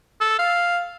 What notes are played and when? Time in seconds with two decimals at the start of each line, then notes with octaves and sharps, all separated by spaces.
0.20 A4
0.39 F5